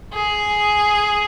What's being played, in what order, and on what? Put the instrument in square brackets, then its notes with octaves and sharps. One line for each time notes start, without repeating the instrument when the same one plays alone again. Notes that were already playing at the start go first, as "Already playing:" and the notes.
[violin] G#4